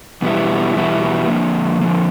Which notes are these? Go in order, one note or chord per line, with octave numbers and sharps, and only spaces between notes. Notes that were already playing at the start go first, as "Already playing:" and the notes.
E2 B2 G3 B3 E4
E2 B2 G3 B3 E4
D3 F3 A#3
D3 F3 A#3